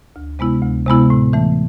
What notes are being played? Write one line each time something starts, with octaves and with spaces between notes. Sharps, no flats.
D2
C3 G#3 B3 E4
D2
C3 G#3 B3 E4
A2
E3 A3